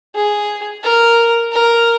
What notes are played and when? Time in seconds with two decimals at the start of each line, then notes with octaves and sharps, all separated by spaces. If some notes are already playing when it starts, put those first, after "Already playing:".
0.15 G#4
0.83 A#4
1.52 A#4